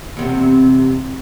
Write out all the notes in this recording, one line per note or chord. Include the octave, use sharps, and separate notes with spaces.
E2 C3